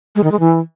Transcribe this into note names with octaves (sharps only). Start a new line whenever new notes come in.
G#3
D#3
G#3
E3